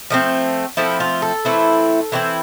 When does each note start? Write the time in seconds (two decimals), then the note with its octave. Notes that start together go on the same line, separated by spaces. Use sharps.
0.10 F3 A3 C4
0.77 F3 A3 C4 E4
1.00 F4
1.22 A4
1.45 E3 A3 C4 E4
2.12 E3 A3 C4 E4